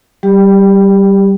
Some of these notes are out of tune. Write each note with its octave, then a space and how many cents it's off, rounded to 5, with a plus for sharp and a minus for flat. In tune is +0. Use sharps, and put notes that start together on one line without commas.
G3 -15 G4 +15